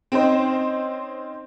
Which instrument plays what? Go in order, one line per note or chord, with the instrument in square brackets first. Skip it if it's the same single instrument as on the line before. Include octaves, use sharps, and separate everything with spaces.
[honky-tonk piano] C4 C#4 D#4 C5